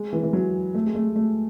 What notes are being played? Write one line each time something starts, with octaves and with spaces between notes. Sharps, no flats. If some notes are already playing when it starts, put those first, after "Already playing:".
Already playing: G#3
E3
E3
F#3
A3
G#3
A3
A3